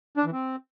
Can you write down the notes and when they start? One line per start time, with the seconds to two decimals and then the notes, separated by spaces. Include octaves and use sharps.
0.17 D4
0.25 E3
0.33 C4